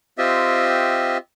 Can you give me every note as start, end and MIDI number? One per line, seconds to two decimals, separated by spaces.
0.18 1.17 60
0.18 1.17 65
0.18 1.17 67
0.18 1.17 75
0.18 1.17 76